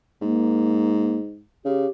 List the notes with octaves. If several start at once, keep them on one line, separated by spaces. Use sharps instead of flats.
G#2 A#3
C#3 G4